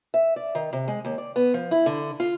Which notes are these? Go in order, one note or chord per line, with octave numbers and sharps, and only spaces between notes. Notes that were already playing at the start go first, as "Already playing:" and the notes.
E5
D5
D#3
C3
G#3
D#2
D5
B3
F3
E4
D3
F4